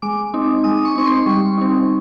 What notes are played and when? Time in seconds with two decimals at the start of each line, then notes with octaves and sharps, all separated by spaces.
0.02 G#3 D6
0.34 C4 D#4
0.64 G#3 D#6
0.85 C#6
0.96 C4 D#4 C#6
1.06 C6
1.26 G3 C#6
1.57 C4 D#4